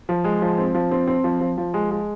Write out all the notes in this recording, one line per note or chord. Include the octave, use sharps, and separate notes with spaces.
F3
G#3
F3
C4
F3
C4
C4
F3
F3
F3
G#3
G#3